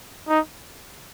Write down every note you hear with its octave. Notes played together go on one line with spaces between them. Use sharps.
D#4